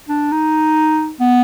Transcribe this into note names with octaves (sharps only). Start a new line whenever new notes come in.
D4
D#4
B3